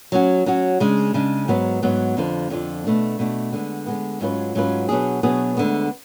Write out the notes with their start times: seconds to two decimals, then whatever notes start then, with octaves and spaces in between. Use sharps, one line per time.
0.12 F#3 C#4 F#4
0.46 F#3 C#4 F#4
0.80 C#3 G#3 D4
1.14 C#3 G#3 D4
1.48 G#2 F#3 B3
1.83 G#2 F#3 B3
2.17 F2 D3 F3
2.50 F2 D3 F3
2.84 B2 A3 D4
3.19 B2 A3 D4
3.53 D3 G#3 B3
3.86 D3 G#3 B3
4.21 G#2 F#3 C#4 F4 B4
4.55 G#2 F#3 C#4 F4 B4
4.89 B2 F#3 B3 D4 G#4
5.23 B2 F#3 B3 D4 G#4
5.57 D2 D3 G#3 B3